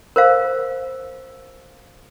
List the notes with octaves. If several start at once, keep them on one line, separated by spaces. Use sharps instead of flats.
A#4 C5 F5